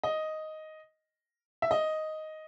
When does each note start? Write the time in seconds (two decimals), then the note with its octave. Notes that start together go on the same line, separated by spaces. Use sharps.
0.03 D#5
1.62 E5
1.71 D#5